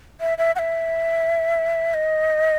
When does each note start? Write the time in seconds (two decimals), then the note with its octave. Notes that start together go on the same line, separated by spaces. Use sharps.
0.21 E5
0.38 E5
0.56 F#5
0.59 E5
1.94 D#5